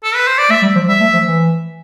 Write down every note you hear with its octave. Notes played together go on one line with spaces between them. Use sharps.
A4
B4
C5
D5
A3 E5
G3
F3
G3 E5
A3
F3
E3